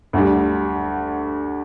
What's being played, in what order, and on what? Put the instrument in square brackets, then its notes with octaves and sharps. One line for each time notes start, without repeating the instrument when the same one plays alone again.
[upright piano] D2 D3 G3